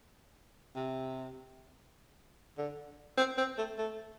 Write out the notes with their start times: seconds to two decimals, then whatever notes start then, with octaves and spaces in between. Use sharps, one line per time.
0.76 C3
2.58 D3
3.17 C4
3.38 C4
3.58 A3
3.78 A3